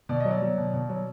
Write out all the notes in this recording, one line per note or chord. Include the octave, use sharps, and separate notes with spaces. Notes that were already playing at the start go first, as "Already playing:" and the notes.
B2 D5
F#3 D#5
D5
F#3
B2
B2
F#3